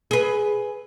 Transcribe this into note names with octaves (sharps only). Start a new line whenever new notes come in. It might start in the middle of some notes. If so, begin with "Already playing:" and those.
G#4 B4